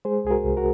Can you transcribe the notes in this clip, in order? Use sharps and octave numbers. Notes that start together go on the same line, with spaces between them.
G#3 G#4 C5
C2 G#4
F#4 A#4
C2
F#4 A#4